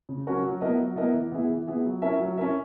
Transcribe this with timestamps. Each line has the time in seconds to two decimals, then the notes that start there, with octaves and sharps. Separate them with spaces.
0.09 C#3
0.27 F#3 C#4 F#4 A#4
0.44 F#3
0.61 B3 E4 A#4 D#5
0.79 F#3
0.96 B3 E4 A#4 D#5
1.14 E3
1.32 B3 E4 G#4
1.49 E3
1.67 B3 E4 G#4
1.85 F#3
2.02 C#4 E4 A#4 E5
2.20 F#3
2.37 C#4 E4 A#4 E5